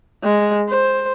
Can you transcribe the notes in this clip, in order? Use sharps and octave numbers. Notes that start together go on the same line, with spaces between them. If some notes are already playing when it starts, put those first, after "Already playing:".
G#3
C5